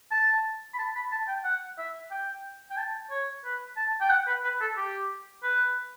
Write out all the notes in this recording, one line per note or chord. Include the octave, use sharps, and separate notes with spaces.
A5
B5
A5
B5
A5
G5
F#5
E5
G5
G5
A5
C#5
B4
A5
G5
F#5
B4
B4
A4
G4
B4